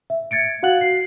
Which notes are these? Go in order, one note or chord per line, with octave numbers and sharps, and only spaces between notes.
E5
G#6 A6 C#7 D7
F#4 F5 F#5 F#6 F#7
C7